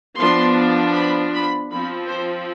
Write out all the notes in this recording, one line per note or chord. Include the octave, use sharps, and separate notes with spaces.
F3 B3 D4 C6
B5
B5
F3 C4 B5
C5